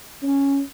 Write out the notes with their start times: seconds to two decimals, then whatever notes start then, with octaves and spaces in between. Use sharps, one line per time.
0.22 C#4